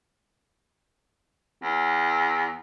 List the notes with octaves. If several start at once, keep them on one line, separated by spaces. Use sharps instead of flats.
E2